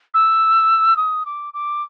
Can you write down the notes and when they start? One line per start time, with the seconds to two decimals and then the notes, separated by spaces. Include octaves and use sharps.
0.14 E6
0.97 D#6
1.26 D6
1.54 D6